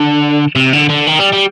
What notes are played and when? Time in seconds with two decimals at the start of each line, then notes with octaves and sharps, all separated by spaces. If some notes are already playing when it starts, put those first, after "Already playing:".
Already playing: D3
0.56 C3
0.73 D3
0.90 D3
1.07 D#3
1.20 G3
1.33 G3